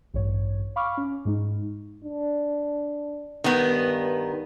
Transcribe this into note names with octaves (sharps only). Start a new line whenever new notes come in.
A1 G2 C#5
F5 B5 C#6 D6 F6
C#4
G#2 G#3 D#4
D4
G2 D#3 B3